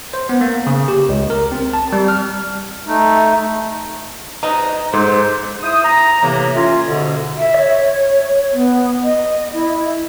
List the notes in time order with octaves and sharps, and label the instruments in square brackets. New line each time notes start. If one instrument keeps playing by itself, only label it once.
[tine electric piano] C5
B3
A#3
C#3
G4
C#2
A#4
C4
A5
G3
F6
[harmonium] A3 D#4
[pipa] D#4 [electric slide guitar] B4 C5 D#5
[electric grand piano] G#2 [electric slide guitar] A4 [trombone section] C5
[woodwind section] E4 C5 D#6
A#5
A2 C3 E3 A#3
A3 C#4 F4
G#2 B2 D3
[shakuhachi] E5
C#5
B3
D#5
E4